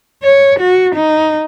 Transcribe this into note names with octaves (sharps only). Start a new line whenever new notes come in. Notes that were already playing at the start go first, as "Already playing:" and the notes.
C#5
F#4
D#4